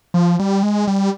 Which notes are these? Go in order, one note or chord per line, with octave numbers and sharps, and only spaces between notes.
F3
G3
G#3
G3